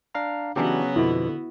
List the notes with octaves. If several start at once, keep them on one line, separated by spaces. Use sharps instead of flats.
D4 F5 A#5
C#3 E3 F#3 B3 C#4 D4 F#4 G4
F2 B2 D3 E4